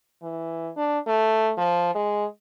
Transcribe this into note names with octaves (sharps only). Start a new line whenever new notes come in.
E3
D4
A3
F3
G#3